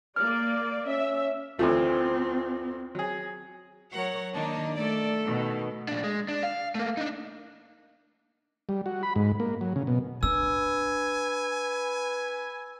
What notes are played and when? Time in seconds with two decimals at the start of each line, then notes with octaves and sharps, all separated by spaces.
0.16 A#3 D5 F6
0.87 C#4 E5
1.59 D2 E3 A3 C4 F4
2.95 F#3 G#4
3.93 F#3 A#4 C#5 F#5
4.34 D#3 A#3 D4 D#4
4.75 A3 A4 D5
5.25 B2 D#3
5.88 A#2 D4
6.04 G#3
6.29 D4
6.43 F5
6.75 A3 A#3
6.97 D4 D#4
8.69 G3
8.86 F#4
9.03 B5
9.16 G#2
9.40 A#3
9.61 F#3
9.76 C#3
9.87 B2
10.23 D4 B4 G#5 E6